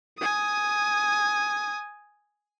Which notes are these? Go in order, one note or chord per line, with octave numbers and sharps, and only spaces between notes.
G#5 D#6